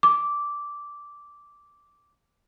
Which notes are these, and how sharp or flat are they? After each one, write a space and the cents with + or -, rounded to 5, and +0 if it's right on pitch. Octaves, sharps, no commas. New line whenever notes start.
D6 -10